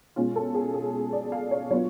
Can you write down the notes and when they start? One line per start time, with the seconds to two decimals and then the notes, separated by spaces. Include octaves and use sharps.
0.16 B2 G#3 C#4 F4
0.36 A4
0.55 G#4
0.74 G#4
1.13 D5
1.32 F5
1.51 C#5
1.70 F#3 B3 D4 F4 C#5